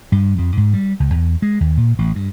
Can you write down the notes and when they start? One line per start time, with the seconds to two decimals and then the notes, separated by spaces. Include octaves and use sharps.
0.12 G2
0.38 F2
0.57 G#2
0.74 G3
1.00 C#2
1.15 E2
1.42 G#3
1.60 D#2
1.77 A#2
1.99 A1
2.15 G2